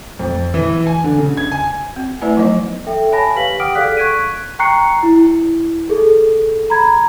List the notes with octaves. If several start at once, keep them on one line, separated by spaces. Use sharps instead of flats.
F2
E3
G#5
D3
C#3
G#6
G#5
C4
A3 E4 B4 D5 F#5 G#5
F3 F#3 B3 D#4 D#5
A4 E5 G5
C#5 G#5 A5 B5 A#6
G4 B4 F5 B6 F#7
F#5 G5 D6 D#6 F6 D7
G#4 A4 D5 F5 F#6 B6
C#6 F#6 G#6 B6 D7 D#7
G5 A#5 C#6 F#6 C7 C#7
E4
G#4 A4
A#5 B5 G#6